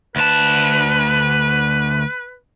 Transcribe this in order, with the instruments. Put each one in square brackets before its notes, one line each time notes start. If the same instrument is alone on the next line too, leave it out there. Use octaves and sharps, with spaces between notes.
[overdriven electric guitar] D2 A5 [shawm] B4